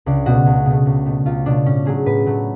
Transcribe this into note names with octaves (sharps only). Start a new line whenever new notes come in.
C#2 D4
B2 A3 F#4
C#2
B2 A3
C#2
B2 A3
C#2 F4
B2 A3 D4
A2 C#4
F#3 A3 G#4
A2 B4
F#3 A3